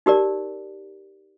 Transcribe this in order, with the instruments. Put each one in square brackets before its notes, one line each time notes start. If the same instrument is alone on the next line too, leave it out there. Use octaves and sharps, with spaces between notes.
[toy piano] D#4 G4 A#4 D5